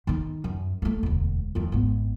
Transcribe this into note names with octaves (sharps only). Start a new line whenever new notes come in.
D#3 D#4
F#2
A3 A#3
E1 D2
F2 D#3
G#1 B3